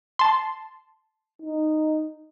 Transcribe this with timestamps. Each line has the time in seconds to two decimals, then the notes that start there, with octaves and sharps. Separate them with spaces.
0.19 A5 C6
1.42 D#4